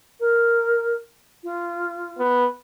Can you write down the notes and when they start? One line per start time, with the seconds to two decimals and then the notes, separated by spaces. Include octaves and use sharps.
0.20 A#4
1.43 F4
2.19 B3